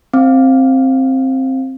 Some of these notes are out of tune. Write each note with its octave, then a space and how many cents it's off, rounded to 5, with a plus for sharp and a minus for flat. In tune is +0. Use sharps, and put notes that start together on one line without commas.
C4 +10 F5 +0